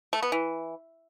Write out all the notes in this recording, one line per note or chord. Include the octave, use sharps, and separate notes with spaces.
A3
B3
E3